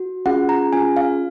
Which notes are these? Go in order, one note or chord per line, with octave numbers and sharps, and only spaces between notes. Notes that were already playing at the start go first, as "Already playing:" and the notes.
Already playing: F#4
C#4 F4 G#4 F#5
A#5
C#4 F4 G#4 G#5
F5